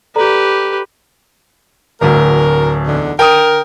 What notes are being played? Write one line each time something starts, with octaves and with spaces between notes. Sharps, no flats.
G4 A4 B4 D5 A#5
D1 D2 A#4
E2 D3 D#4
D3 A#4 G5 D#6